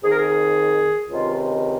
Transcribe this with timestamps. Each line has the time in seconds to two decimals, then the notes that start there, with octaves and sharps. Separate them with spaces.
0.03 F2 D#3 G#4
0.10 A#4
0.17 G#4
1.10 C#2 C3 D#3 F4